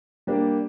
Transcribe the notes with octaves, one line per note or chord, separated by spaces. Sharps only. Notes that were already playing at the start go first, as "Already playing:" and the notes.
G3 A#3 D4 G4